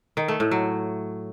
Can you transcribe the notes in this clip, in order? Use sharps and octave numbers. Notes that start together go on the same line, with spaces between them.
D#3
A3
A2
F#3